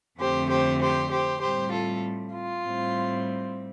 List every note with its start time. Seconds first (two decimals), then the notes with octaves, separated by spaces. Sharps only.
0.19 F2 D3 A3 C4 G4 C5
0.50 G4 C5
0.81 G4 C5
1.11 G4 C5
1.42 A2 G3 C4 G4 C5
1.72 F4 A4
2.33 F4
2.63 A2 G3 C4